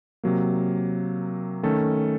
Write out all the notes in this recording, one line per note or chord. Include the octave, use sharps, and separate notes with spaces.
C3 F#3 A#3
D#3 A3 C#4 A4